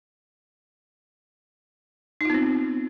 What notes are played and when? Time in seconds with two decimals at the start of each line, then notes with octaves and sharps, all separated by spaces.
2.21 D#4
2.25 F4
2.30 B3
2.34 C4